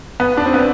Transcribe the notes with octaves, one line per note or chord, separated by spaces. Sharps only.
B3
D4
C4
B3